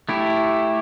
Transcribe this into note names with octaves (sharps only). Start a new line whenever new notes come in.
A3 E4 G4